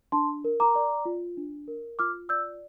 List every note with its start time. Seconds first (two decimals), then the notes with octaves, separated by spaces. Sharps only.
0.12 D4 A5 C6
0.44 A#4
0.60 A#5 D6
0.75 D5
1.05 F4
1.37 D4
1.68 A#4
1.99 F4 D6 F6
2.29 D5 E6 G6